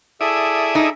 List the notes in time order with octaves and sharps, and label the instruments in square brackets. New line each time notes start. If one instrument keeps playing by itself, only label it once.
[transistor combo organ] E4 D5 D#6 [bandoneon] G#4 A4 E5
[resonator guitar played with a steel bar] D#4